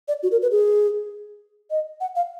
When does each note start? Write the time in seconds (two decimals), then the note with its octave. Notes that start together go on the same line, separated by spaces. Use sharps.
0.08 D5
0.23 F#4
0.32 A#4
0.42 B4
0.51 G#4
1.71 D#5
2.01 F#5
2.16 F5